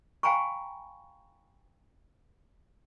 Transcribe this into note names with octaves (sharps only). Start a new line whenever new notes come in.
F5 G5 G#5 A#5 B5 C#6